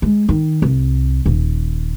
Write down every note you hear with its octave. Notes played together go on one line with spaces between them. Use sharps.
G#3
D#3
C2
D#1